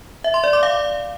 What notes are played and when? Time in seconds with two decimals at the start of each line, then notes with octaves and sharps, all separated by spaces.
0.24 E5
0.34 C6
0.44 D5
0.53 D6
0.63 F5